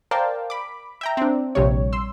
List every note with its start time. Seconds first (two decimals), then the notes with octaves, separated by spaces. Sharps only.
0.11 A#4 C5 D5 F5 G5 A5
0.50 B5 D6
1.01 E5 G5 A#5
1.17 C4 D4
1.55 A#1 C3 G3 C#5
1.93 C6 E6